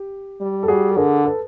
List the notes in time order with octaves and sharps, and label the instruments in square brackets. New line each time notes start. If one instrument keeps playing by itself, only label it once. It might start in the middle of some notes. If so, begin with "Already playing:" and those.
Already playing: [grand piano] G4
[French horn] G3
[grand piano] A4
[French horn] G3 [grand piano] F#4 G#4
[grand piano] A4
[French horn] D3 [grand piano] G#4 A#4
[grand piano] A4 B4